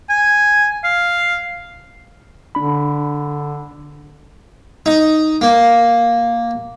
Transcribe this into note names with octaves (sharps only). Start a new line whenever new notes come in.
G#5
F5
D3 D4 B5
D#4
A#3